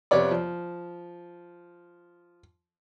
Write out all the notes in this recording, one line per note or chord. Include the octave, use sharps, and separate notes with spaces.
F2 C3 B3 C#5 D5 D6
F3